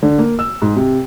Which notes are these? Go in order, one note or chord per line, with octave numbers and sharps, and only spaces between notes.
D3
A#3
E6
G#2
C3